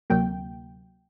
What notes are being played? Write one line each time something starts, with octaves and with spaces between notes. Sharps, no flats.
D2 C3 F#3 A#3 G5